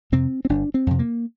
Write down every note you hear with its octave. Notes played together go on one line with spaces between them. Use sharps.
F2 C3 C4
C4
G1 D4
C4
F2 C3
A#3